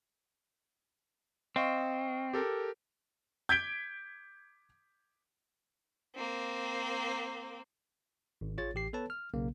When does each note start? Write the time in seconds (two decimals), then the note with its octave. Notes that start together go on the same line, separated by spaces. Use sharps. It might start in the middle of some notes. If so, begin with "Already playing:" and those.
1.56 C4 D#5 F5 C#6
2.33 G4 A4 A#4
3.49 G6 G#6 B6 D7 G7
6.15 A#3 C4
8.41 G#1
8.58 A1 F4 G#4 C#5 A6
8.75 A1 G4 C7
8.93 B3 A4 B4 C#5 A5
9.10 F6
9.34 B1 C#3 A#3